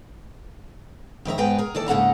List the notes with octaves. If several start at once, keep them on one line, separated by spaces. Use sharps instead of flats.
F2 D#3 E5 A#5
G#2 G#3 B3 B4 G5 A#5
G#4 A#4
D#2 E3 A4 D5
G#2 C#3 A#3 A4 F#5 A#5